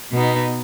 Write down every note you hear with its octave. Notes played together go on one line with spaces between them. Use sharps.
B2 B3 D#4